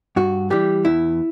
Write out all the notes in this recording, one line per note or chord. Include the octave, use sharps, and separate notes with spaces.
G2 F#4
E3 G3 G4
E2 E4